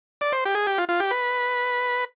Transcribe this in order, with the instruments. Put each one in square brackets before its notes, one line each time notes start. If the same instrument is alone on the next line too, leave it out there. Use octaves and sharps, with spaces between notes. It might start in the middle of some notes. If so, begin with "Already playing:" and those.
[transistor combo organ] D5
C5
G4
G#4
G4
F4
F4
G4
B4